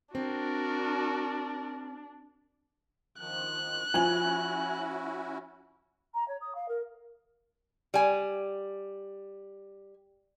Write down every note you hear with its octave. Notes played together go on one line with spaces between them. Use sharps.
C4 D4 F#4 A#4
D#3 F3 F#6
F3 C#4 E4 F#4 G#5 F#7
A#5
C#5
D#6
F5
A#4
G3 G#5